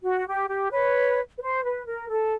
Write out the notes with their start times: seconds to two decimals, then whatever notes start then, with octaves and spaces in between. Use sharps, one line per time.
0.03 F#4
0.26 G4
0.48 G4
0.71 B4 C#5
1.36 B4
1.40 C5
1.63 B4
1.86 A#4
2.09 A4